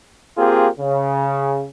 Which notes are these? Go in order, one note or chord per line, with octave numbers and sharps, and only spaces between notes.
A#3 C4 F4 G4 G#4
C#3